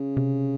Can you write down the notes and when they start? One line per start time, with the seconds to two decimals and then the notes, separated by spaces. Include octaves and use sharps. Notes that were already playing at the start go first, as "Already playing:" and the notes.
Already playing: C#3
0.17 C3